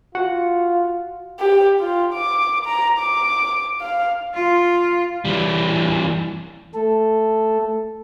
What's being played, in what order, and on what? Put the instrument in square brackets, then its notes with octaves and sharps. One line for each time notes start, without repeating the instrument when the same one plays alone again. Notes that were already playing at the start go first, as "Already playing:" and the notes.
[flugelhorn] F4 [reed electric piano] F#4 F#5
[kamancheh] G4
F4
D6
A#5
D6
F5
[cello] F4
[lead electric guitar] E3 G3
[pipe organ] A3 A4